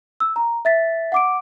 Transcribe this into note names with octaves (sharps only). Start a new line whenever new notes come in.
E6
A#5
E5 A6 B6
F#5 D6 D7